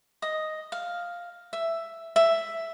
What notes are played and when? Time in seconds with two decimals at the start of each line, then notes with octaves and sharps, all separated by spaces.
0.22 D#5
0.72 F5
1.53 E5
2.16 E5